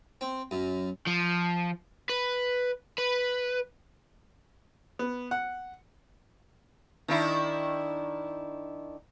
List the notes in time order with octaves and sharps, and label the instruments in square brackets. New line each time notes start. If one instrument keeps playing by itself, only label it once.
[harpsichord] C4
F#2
[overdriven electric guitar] F3
B4
B4
[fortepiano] B3
F#5
[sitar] D#3 D4 E4